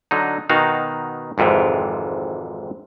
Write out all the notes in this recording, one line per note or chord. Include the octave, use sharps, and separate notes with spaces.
D3 F#3 D#4
B2 D#3 D#4 F#4 F5
G#1 F2 G#2 C3 E3